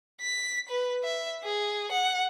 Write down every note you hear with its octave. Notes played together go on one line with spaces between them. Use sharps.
B6
B4
E5
G#4
F#5